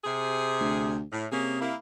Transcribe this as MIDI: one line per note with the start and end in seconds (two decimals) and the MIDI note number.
0.04 0.96 48
0.04 0.96 68
0.60 1.03 38
1.12 1.26 45
1.32 1.71 48
1.32 1.58 58
1.32 1.58 61
1.32 1.58 68
1.61 1.76 58
1.61 1.76 64